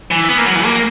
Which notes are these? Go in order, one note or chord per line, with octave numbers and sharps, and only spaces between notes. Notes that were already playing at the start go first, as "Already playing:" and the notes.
E3
B3
A#3
F#3
E3
A#3